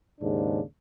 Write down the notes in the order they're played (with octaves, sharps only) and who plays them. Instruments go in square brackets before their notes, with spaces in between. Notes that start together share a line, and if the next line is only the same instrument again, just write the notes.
[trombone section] D#2 G#2 C#3 D4